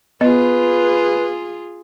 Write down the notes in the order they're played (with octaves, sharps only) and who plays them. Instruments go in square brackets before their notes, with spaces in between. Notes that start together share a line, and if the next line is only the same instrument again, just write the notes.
[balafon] B3 D#5 [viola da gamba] F4 G#4 [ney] B4